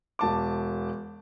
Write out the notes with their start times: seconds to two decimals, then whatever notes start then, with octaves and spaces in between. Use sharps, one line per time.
0.19 E1 A5 D6